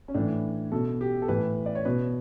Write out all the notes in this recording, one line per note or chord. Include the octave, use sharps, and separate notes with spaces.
C#4
A2 E3 D4
B2 A4
G4
A4
A2 E3 B4
D5
C#5
B2 B4